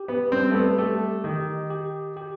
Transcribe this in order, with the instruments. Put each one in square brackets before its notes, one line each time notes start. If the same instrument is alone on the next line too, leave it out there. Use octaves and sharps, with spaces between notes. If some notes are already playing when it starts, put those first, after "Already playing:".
Already playing: [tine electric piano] G4
[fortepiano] B3
[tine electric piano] G3 [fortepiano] C4
[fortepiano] A3
B3
[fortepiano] A3 [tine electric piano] G4
[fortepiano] D#3 [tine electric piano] G4
[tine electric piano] G4
G4